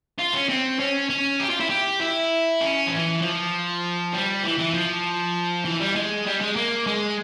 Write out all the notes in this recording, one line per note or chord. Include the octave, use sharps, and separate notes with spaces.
F4
C#4
C4
C#4
C#4
G4
F4
E4
G4
E4
C#4
F3
E3
F3
G3
E3
E3
F3
E3
G3
G#3
G3
G#3
A#3
G#3